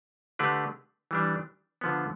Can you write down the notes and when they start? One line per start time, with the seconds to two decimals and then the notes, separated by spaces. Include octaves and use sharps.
0.39 D3 A3 D4 G4 B4
1.11 E3 G3 D4
1.81 D3 F3 B3